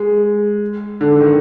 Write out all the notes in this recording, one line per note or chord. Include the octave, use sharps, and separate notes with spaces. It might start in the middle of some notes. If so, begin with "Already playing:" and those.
Already playing: G#3
D3
D#3